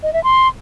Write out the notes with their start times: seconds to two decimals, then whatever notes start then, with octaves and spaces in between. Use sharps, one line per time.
0.03 D#5
0.13 E5
0.24 C6